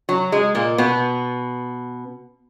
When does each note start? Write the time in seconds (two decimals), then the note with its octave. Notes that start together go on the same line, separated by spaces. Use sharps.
0.09 F#3
0.32 G#3
0.55 A#2 A#3
0.78 B2 B3